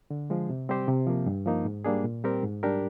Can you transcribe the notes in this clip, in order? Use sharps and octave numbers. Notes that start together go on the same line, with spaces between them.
D3
F3 G#3
C3
G3 C4 G4 C5
C3
F3 A#3
G2
F3 A#3 D#4
G#2
G3 A#3 D4 G#4
A#2
G3 C4 G4 A#4
G#2
G3 D4 G4 A#4